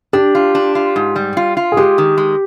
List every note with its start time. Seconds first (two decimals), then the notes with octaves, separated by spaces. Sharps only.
0.13 D4 G4
0.35 F4
0.55 D4
0.75 F4
0.96 G#2
1.16 G3
1.37 F4
1.57 F4
1.72 G#4
1.77 G#3 G4
1.98 D#3
2.17 G#3